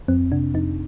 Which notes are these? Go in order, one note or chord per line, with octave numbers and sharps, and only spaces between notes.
F2 C4
C3 D4
F2 D#4